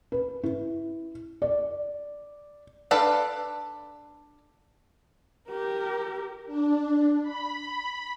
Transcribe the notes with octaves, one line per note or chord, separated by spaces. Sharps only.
B4
E4
D5
D4 A4 B4 D5 F5
G4 A#4
D4
B5